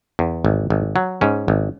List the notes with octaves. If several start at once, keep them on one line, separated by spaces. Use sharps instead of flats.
E2
G#1
G#1
F#3
G#2 C#4
G#1